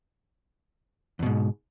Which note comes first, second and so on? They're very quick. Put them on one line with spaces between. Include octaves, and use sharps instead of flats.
E2 B2 G#2